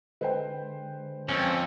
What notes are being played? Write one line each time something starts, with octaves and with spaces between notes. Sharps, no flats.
D3 G#3 B4 C5 G5
F2 C4 C#4